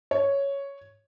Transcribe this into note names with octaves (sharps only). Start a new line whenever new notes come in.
C#5